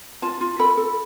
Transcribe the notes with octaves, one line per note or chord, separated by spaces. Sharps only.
F4 A5
F4
A4 B5
A4